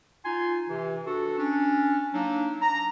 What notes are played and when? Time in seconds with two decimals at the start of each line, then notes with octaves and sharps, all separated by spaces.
0.24 D#4 F4 G#5 C6
0.68 C3 E3
1.06 D4 F#4 A4
1.38 C#4 D4
2.13 F#3 A#3 D4 D#4
2.61 A#5